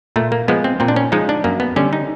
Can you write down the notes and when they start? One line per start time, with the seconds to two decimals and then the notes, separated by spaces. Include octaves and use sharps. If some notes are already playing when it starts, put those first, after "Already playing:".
0.16 A#2 A3
0.32 A#3
0.48 F3 G#3 B3
0.64 C4
0.80 A#2 C4
0.88 D4
0.96 C#4
1.12 F3 G#3 D#4
1.29 D4
1.44 F#2 A#3
1.60 B3
1.76 D3 G3 C#4
1.93 D#4